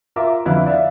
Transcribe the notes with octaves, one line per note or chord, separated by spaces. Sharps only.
F4 A#4 E5 A#5 D6
G1 F2 E4 F5 F#6
D5 E5 F5